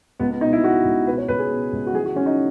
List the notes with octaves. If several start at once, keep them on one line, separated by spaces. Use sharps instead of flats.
C#2 B3
B3
B2 D#4
E4
B2 F#4
C#2
B2 B4
C#5
C#2 B4
G#4
B2
C#2
F#4
E3 G#4
F#4
E3 C#4
D#4